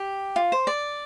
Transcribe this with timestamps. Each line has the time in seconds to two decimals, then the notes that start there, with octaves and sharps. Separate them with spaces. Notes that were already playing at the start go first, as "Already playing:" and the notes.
Already playing: G4
0.36 F4
0.52 C5
0.67 D5